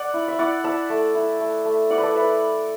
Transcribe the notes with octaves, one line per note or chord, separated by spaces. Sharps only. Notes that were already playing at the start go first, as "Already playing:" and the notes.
Already playing: D5 F#5
E4
E5
E4 D5 F#5
E4 E5 A5
A3
E4
A3
A3
E4 D5 F#5
B4
A4 D5
E4 B4 E5